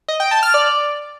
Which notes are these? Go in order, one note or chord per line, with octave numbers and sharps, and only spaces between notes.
D#5
G5
A5
F6
D5